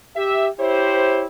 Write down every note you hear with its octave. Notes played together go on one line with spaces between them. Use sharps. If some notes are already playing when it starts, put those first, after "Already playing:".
G4 E5
E4 G4 C5 C#5